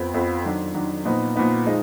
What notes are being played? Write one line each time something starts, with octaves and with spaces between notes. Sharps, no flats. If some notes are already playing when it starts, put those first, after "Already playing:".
Already playing: F2 F3 B3
F2 F3 B3
D#3 F#3 D4
D#3 F#3 D4
A#2 F3 B3 D#4
A#2 F3 B3 D#4
F3 G#3 D#4